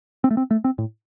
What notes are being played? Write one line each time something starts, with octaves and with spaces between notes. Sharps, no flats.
C4
A3
C4
A3
C4
A2